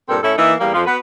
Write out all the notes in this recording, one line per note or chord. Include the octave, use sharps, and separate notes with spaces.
G2 A#2 C4 A4 A#4
A2 C#4 E4 A4
E3 A#3 D#4 E4
E2 G3 A#3
F2 F3
B3 F#4 B4